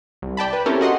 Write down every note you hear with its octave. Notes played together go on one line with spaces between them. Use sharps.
C2
D5 G5 A5 B5
B4
C4 C#4 E4 G4 A4 A#4
F#4 D#5 F#5 C6